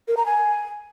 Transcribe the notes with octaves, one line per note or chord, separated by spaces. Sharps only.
A#4
A#5
G#5